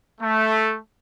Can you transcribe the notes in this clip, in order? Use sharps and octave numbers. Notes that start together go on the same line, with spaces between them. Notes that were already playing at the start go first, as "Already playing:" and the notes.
A3